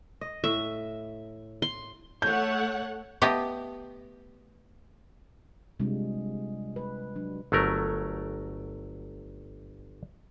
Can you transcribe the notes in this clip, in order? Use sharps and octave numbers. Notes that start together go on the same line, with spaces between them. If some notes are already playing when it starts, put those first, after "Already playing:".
D#5
A2 E5
C6
A3 C#5 F#5 G6
A3 B3 G4 D#5
C3 G3 G#3 D4 F4
B4
F#3 D4
G1 F#3 A3 A#4